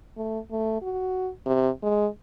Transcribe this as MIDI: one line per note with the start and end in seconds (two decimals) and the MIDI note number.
0.17 0.39 57
0.51 0.78 57
0.82 1.30 66
1.46 1.69 48
1.83 2.07 56